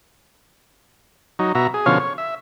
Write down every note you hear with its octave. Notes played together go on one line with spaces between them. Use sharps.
F#3 D#4
B2 F#4 E5 A#5
G#4
B2 D3 F3 C#4 C#5 F5
C#5
E5